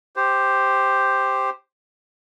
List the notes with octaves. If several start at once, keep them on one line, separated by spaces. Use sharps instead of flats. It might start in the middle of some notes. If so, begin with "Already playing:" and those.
G4 C5